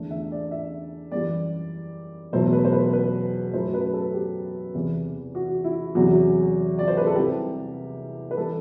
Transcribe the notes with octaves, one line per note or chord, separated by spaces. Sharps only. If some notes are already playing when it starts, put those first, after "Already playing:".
Already playing: E2 D3 A3
E5
D5
E5
F#2 E3 G3 D5
E2 B2 F#3 A3 C5
B4
C5
B4
B4
F#2 F#3 A3 C5
B4
A4
G4
E2 C3 E3
F#4
E4
E2 C3 F#3 F#4
D5
C5
B4
A4
C2 C3 G3 G4
B4
E3 G3 A4